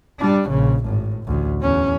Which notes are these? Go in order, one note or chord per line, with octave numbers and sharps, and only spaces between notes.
G3 D4
A#1 C#3
G#1 A2
A1 D2
E2 C#4